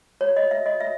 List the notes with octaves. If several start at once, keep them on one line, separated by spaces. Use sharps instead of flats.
C#5
D#5
E5
D#5
E5